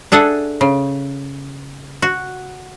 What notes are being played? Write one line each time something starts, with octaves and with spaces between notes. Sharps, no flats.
D4 G#4 A4 E5 F#5
C#3
F#4